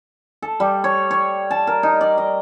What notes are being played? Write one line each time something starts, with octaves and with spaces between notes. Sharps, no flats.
A4
G3
C#5
C#5
A5
A#4
D#4
D5
D#5